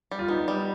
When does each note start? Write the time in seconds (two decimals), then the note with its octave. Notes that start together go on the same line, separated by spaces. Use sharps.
0.11 G3
0.19 F4
0.28 B3 D#4
0.48 G3